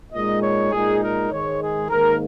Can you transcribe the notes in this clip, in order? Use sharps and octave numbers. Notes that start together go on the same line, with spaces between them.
A#2 G#3 D#4 D#5
C#5
A#2 G#3 D#4 G#4
A#4
G#2 D#3 G#3 C#5
G#4
G#2 D#3 A#3 A#4